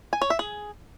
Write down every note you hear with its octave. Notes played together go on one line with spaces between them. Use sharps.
G#5
C#5
E5
G#4